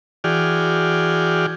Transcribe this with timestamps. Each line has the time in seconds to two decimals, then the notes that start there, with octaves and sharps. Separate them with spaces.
0.24 E3 F#4 G#4 D5 G5 F6